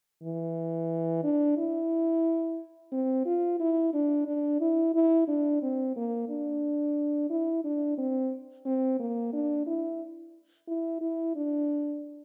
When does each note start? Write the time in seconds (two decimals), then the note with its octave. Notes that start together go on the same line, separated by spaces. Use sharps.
0.23 E3
1.24 D4
1.57 E4
2.92 C4
3.26 F4
3.60 E4
3.93 D4
4.27 D4
4.61 E4
4.94 E4
5.28 D4
5.62 C4
5.96 A#3
6.29 D4
7.30 E4
7.64 D4
7.98 C4
8.66 C4
9.00 A#3
9.33 D4
9.66 E4
10.67 E4
11.01 E4
11.35 D4